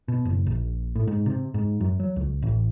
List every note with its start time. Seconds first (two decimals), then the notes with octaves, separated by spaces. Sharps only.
0.08 B2
0.25 F#1
0.46 A#1
0.95 A2
1.07 G#2
1.26 C3
1.54 G#2
1.80 F#2
2.00 F#3
2.16 C#2
2.42 A1